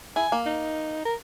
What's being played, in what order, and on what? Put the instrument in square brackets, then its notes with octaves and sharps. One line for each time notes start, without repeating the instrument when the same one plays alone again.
[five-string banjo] E4 [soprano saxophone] G#5
[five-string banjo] A#3
[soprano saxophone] D#4
A#4